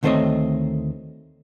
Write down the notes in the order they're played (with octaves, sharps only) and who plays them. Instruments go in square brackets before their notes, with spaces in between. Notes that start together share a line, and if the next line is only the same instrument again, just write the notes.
[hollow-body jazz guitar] D2 D#3 A3 C4 C#5 D#5